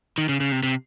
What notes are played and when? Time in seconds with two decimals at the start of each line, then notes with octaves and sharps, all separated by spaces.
0.18 D#3
0.29 C#3
0.40 C#3
0.52 C3
0.63 C3